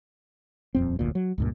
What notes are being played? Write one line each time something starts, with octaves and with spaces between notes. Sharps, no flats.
D#1 F2 C4
F1 D2 A#2
F#3
C#2 G2 A#2